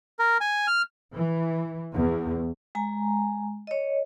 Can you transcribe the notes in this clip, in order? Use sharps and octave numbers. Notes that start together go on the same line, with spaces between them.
A#4
G#5
F6
E3
E2
G#3 G#5 A#5
C#5 D#5